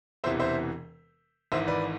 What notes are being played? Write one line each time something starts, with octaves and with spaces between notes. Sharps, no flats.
E1 E2 C3 E3 C5 E5
C5 E5
G#1 G#2 E3 C5 E5
B4 D5